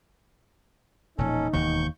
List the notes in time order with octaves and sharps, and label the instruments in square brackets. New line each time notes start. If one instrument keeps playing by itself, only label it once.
[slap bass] E1 A#2 F3 [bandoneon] C#4 A4 [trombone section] D#4
[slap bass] E1 [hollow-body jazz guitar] D#2 [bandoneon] C#6 G6